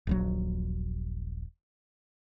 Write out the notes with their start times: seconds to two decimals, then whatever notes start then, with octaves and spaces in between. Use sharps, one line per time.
0.07 D#1 A#1 F#3